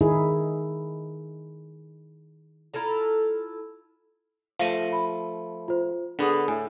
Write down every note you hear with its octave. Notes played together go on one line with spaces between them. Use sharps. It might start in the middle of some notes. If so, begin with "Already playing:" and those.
D#3 D#4 E4 G#4
E4 F4 A4 A#5
F3 A3 F5 A#6 D#7
B5
F4 C5
D3 B3 D4 G#4 D#6
A2 E5 G#5